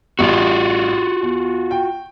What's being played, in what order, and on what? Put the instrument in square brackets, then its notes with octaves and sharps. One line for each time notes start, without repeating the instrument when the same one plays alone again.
[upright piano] A1 G3 [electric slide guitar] F4 F#4
[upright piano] E2
G5